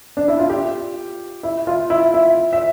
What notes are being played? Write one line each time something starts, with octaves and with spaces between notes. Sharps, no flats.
D4
E4
F4
G4
E4
F4
E4
E4
E5